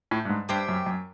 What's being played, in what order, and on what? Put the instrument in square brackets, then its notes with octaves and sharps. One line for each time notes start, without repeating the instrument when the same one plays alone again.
[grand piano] A2
G2
G#2
[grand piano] G2 [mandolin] G4 C5 E5 G5
[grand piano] F#2
F#2